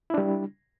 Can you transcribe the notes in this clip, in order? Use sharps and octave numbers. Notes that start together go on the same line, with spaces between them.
G3 D4 E4